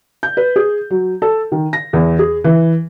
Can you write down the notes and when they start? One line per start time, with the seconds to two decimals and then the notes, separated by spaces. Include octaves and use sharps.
0.23 G6
0.37 B4
0.56 G#4
0.90 F#3
1.22 A4
1.52 D#3
1.73 A#6
1.93 E2
2.19 G#4
2.44 E3